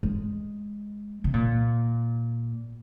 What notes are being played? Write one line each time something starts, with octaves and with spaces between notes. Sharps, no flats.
G#3
C3
A#2